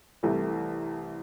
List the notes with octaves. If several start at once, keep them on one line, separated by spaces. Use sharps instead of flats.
C2 C3 E3 A3